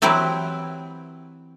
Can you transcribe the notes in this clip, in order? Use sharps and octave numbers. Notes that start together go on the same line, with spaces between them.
E3 F#3 C4 E4 G4 B4